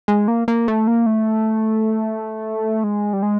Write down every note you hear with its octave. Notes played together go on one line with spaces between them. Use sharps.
G#3
A#3
A#3
A3
A#3
A3
G#3
G3
G#3